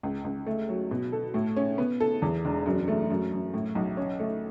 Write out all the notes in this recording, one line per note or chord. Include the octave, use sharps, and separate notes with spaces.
C#2
C#2
A3
F#3
B2
A4
A2
C#4
B3
A4
E2
E1
F#2
A3
F#2
F#2
A2
B1
C#4
A3